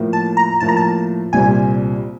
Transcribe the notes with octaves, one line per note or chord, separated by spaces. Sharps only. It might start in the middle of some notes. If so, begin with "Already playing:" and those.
Already playing: A2 F3 A#3
A5
A#5
A2 F3 A#3 A5
A#5
A5
C2 A#2 G3 C4 G#5